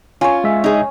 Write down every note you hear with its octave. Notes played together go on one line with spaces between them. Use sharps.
C#4 F4 C#5
G#3 E5
D#4 G#4